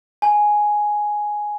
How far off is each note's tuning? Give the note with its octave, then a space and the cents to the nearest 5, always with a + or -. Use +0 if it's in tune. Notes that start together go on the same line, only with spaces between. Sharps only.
G#5 +5